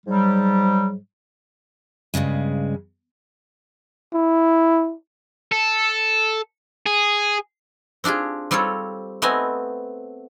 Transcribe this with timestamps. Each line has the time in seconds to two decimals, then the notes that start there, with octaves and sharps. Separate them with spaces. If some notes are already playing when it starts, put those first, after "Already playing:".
0.06 G#2 F#3 G3
2.14 G2 A#2 C#3 G#3
4.14 E4
5.52 A4
6.86 G#4
8.04 C4 D4 F4 G4 G#4
8.51 G3 C4 F4 A4 C#5
9.22 A3 B3 C4 D#5 G#5